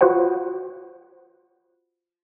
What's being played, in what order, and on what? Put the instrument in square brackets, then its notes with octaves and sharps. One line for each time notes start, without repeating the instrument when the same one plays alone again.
[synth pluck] F4 F#4 B4 C5 F#5